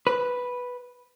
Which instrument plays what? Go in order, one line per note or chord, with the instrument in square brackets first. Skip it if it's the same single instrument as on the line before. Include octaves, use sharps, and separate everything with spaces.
[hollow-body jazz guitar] B4